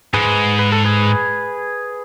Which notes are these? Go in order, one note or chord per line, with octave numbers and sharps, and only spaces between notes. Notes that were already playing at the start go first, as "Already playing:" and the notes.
G#2 G#4 B4
B4
A4
G#4 B4